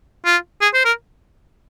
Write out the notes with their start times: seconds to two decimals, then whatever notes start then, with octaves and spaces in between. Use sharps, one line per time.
0.25 F4
0.61 G#4
0.74 C5
0.85 A#4